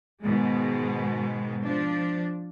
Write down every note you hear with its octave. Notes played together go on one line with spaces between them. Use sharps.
G#2 B2 D#3 G#3
F3 D4